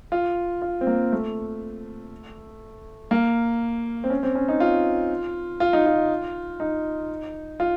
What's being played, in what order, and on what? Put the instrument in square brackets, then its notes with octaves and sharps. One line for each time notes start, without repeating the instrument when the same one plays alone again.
[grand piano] F4
F4
C4
A#3
A3
A#3
C4
C#4
C4
C#4
D#4
F4
F4
D#4
F4
D#4
F4